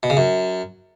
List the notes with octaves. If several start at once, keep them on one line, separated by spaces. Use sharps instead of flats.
B2
C#3
F#2